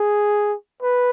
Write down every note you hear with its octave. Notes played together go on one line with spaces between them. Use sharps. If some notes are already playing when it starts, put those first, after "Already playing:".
Already playing: G#4
B4